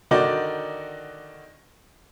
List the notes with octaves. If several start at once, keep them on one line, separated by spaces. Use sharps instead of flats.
D3 D#3 D#4 F#4 D5